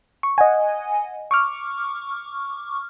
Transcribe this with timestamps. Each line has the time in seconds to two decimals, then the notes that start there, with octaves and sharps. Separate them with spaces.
0.23 C#6
0.38 D#5 F#5 G#5
1.31 C#6 D6 F6